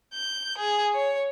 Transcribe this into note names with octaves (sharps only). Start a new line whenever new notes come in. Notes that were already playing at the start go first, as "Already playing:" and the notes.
G6
G#4
C#5